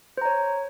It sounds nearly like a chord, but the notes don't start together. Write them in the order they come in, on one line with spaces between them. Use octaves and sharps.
C5 A#5 C#5